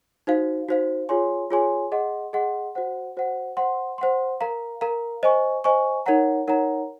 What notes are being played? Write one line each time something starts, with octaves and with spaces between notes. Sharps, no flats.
D#4 F#4 C5 F5
D#4 F#4 C5 F5
F4 G#4 C#5 G#5 C6
F4 G#4 C#5 G#5 C6
G#4 D#5 F#5 C6
G#4 D#5 F#5 C6
F#4 C5 F#5
F#4 C5 F#5
C5 F#5 C6
C5 F#5 C6
A#4 F5 A#5
A#4 F5 A#5
C5 D#5 G#5 C#6
C5 D#5 G#5 C#6
D#4 A#4 C#5 F#5 A#5
D#4 A#4 C#5 F#5 A#5